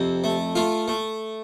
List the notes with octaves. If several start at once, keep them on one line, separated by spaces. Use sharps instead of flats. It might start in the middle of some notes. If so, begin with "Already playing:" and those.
Already playing: F2 C3
A3
A3 F4 F5
A3